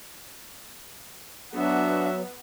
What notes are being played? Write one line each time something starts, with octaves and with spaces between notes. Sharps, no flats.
F#3 B3 D4 F#4 E5